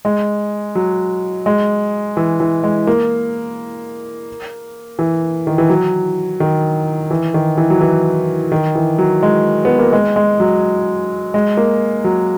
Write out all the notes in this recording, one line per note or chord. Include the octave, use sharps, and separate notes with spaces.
G#3
F#3
G#3
E3
E3
G#3
A#3
E3
D#3
E3
F#3
D#3
E3
D#3
E3
F#3
E3
D#3
E3
F#3
G#3
B3
A#3
G#3
G#3
F#3
G#3
A#3
F#3